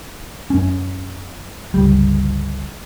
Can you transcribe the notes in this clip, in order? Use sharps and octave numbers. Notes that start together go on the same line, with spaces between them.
F#2 C#4
G1 C#2 G3